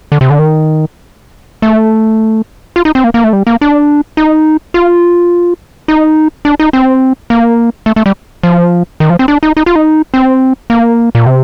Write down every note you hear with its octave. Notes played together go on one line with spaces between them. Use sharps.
D3
C3
D3
D#3
A3
F4
D#4
C4
A#3
A#3
A3
G3
A#3
D4
D#4
F4
D#4
D4
D#4
C4
A#3
A3
A3
G3
F3
D#3
F3
C4
D4
D#4
D#4
F4
D#4
C4
A#3
A#2
C3